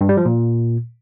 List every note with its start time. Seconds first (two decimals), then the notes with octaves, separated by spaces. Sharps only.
0.01 G2
0.09 G3
0.17 F3
0.26 A#2